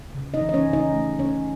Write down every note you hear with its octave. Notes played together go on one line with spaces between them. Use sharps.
C#3
D#4 D#5
E3
D#5
C#4 C#5
C#3
D#4 D#5
A3
C#3 C#4 C#5